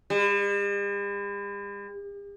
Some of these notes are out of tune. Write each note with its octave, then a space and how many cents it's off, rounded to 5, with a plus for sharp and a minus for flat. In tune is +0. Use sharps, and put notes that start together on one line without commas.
G3 +45